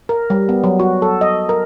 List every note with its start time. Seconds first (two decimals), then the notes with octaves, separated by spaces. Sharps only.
0.09 A#4
0.30 G3
0.49 B3
0.64 F#3
0.80 F#4
1.02 A4
1.21 D#5
1.49 A#4